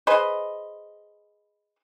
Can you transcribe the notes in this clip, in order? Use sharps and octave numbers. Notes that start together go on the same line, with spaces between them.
G#4 B4 C5 D#5